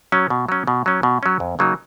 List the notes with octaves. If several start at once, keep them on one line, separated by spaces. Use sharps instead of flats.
F#3 C#4
B2
F#3 C#4
B2
F#3 C#4
B2
F#3 C#4
F2
C#3 F#3 A#3 D#4